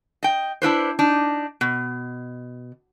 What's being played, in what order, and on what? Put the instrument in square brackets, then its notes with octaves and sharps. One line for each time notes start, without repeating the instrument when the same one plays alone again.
[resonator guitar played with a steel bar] D#5 G5
D4 E4 B4 C5
D4 D#4
B2